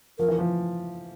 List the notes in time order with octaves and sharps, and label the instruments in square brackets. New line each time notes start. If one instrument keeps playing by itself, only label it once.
[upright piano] F3 [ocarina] A#4
[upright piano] E3
F3